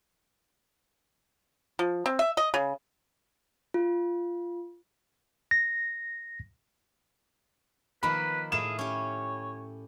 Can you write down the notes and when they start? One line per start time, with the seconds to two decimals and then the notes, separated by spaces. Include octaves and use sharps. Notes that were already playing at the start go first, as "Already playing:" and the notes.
1.79 F3
2.06 C4
2.19 E5
2.37 D#5
2.54 C#3
3.74 F4
5.51 A#6
8.03 D#3 F3 A#3 B4 B5
8.52 A2 E4 G#4 F5 E7
8.79 C#4 G4 C#5